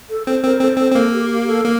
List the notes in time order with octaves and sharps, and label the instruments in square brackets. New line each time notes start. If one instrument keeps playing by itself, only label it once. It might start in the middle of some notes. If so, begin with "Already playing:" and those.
[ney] A4
[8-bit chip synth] C4 [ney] A4
[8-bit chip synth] C4 [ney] A#4
[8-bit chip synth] C4 [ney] A4
[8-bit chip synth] C4 [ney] A4
[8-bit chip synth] C4
[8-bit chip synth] A#3 [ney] A4
[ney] G4
G4
A4
[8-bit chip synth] A#3